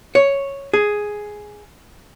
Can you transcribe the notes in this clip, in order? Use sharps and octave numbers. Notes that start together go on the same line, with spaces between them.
C#5
G#4